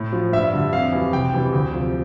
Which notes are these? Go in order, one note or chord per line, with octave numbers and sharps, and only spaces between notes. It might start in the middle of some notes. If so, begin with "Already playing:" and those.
Already playing: A2
F3
G2 E5
D3 G3
F2 F5
E3 G3
C2 G5
C3 E3 G3
D2
C3 F3